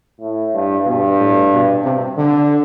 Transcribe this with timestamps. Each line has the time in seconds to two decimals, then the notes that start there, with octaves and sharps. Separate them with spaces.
0.21 A2
0.54 G2
0.86 G2 B2
1.19 A2
1.53 B2
1.84 C3
2.18 D3